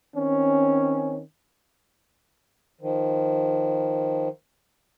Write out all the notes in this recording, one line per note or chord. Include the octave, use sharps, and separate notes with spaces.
D#3 C4 C#4
D#3 F3